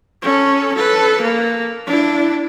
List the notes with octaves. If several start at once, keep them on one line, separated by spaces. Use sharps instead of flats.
C#4 A4
A4 B4
A#3
D4 E4